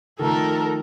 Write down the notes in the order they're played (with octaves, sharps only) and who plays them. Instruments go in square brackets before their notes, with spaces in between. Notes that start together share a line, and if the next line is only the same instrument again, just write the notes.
[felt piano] D#3 F3 A3 [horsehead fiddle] A4 A#4